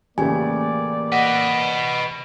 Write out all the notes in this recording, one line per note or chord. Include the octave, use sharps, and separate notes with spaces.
A1 C#3 A3 A#3 G4 D5 G#5
B4 D#5 F#5